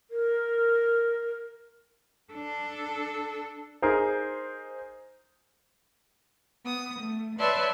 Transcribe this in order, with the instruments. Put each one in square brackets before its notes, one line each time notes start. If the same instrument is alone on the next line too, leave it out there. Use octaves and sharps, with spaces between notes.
[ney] A#4
[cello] D4 A4
[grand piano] D#4 G#4 A#4 C5
[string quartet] B3 D#6
A3
B4 C#5 D5 E5 A5 C6